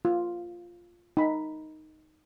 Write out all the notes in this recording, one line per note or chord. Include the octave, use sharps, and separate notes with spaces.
F4
D#4 B5